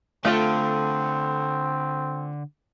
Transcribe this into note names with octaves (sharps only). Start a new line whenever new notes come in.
D3 A3 C4 F4 A4